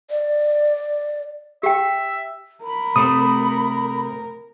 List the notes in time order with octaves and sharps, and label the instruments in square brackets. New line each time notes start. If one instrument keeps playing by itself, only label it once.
[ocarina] D5
[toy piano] G4 G5 [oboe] E5
[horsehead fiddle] A#4 [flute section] B5
[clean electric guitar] C3 A3 C4 [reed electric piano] D#6